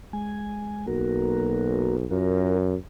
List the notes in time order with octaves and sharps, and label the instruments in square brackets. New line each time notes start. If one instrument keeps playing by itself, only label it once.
[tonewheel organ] G#3 G#5
[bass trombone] B1 [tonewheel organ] A#3 F#4 A#4
[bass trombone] F#2 [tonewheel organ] F4 F#4 A#4